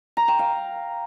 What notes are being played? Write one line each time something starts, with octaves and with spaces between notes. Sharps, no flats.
A#5
G5
F5